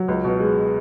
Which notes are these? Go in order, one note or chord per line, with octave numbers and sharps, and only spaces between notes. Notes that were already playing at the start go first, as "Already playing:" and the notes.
Already playing: F#3
C#2
B2
G#3